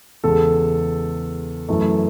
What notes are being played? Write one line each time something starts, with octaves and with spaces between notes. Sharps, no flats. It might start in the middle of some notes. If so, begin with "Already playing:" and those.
E2 C#3 G#3 A4
F#2 E3 A3